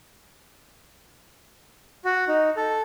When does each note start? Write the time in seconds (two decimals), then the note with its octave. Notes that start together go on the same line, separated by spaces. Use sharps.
2.05 F#4
2.28 D#4
2.57 A4